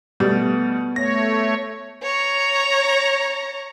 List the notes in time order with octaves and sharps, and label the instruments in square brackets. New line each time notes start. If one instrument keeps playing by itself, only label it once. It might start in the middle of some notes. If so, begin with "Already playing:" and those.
[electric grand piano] B2 A3 [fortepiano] G3 [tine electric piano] B3
[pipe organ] A3 C#5 [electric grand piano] A#6
[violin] C#5 A#5